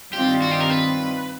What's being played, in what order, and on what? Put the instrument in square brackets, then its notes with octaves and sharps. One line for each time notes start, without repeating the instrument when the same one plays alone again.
[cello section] G2 D#3 G3 C4 F4 [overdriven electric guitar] G4
[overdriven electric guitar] F#4
G4
A#4
B4